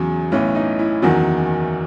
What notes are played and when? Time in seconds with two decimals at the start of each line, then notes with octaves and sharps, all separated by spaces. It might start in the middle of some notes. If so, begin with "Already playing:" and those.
Already playing: E2 C#3 F#3
0.32 B1 A2 E3 C#4
0.55 D#4
0.79 E4
1.02 F#1 E2 D#3 F#3 F#4